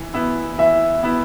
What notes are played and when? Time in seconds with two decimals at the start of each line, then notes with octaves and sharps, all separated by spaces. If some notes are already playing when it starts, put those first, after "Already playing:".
Already playing: E3
0.14 B3 E4
0.58 E3 E5
1.03 B3 E4